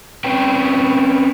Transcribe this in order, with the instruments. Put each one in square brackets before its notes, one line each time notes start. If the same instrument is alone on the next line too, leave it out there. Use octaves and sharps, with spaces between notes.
[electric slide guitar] C4 C#4 B4 G5